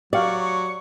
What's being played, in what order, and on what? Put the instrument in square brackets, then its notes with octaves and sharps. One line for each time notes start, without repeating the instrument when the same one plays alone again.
[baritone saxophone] F#3 [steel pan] G4 F5 [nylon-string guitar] D5 [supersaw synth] C#6